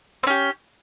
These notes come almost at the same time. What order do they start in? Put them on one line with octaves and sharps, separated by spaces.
C4 C#4 G4